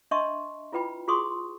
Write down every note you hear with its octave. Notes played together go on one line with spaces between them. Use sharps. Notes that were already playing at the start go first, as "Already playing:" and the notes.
D4 D#5 E5 A5 C6 C#6
E4 F4 B4 G5 B5
F4 F#4 G#4 C6 C#6 D#6